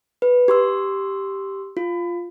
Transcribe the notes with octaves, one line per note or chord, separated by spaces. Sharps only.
B4
G4 C6 E6
F4